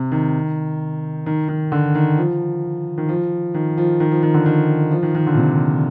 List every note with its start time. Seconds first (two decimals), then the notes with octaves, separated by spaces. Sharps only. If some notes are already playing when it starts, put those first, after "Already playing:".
Already playing: C3
0.12 D#3
1.26 D#3
1.48 D#3
1.72 D3
1.95 D#3
2.18 F3
2.98 D#3
3.09 F3
3.54 D#3
3.78 F3
4.00 D#3
4.11 F3
4.23 D#3
4.34 D3
4.46 D#3
4.91 F3
5.03 D#3
5.15 D#3
5.27 D3
5.33 A#2
5.37 C3